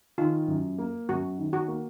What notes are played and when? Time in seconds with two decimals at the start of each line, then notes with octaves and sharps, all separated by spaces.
0.18 D#3 F4
0.48 F#2
0.78 A#3
1.09 F#2 F#4
1.38 D#3
1.53 F#4
1.68 A#3